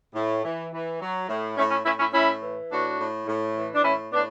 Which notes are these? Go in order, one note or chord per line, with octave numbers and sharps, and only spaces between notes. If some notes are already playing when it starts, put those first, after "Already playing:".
A2
E3
E3
F#3
A2
A2 A3 C#4
C#4 E4
A2 C#4 E4
C#4 E4
A2 C#4 E4
E3
A2 D4 F#4
A2
A2
E3
D4
A2 C#4 E4
A2 B3 D4